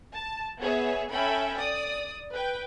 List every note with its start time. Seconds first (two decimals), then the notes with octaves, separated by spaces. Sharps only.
0.13 A5
0.59 B3 G#4 C#5 E5
1.11 C#4 A4 E5 G5 B5
1.57 D5 D#6
2.33 B4 G5